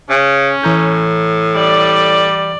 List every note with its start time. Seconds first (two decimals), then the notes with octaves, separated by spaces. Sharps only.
0.10 C#3 C#4
0.63 A2 E3 A#5 G6
1.56 G3 D5